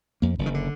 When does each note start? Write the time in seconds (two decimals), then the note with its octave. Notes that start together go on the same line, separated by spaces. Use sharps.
0.22 F2 A#3
0.39 F#1
0.46 D#3
0.54 D3